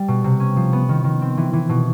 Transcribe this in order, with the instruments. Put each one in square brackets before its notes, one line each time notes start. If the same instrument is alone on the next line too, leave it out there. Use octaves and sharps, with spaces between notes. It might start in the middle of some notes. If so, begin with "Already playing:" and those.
Already playing: [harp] G3
B2
C3
C#4
F3
B3
D#3
D#3
C4
E3
E3
B2